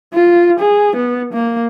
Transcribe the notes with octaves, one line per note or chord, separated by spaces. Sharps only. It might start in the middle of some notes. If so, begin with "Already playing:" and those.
F4
G#4
B3
A#3